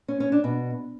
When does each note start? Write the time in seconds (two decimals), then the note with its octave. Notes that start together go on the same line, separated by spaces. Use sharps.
0.08 C#4
0.20 C#4
0.32 D4
0.44 B2